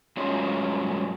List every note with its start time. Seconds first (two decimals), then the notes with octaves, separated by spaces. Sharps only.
0.17 G2 F#3 G#3 C#4 F4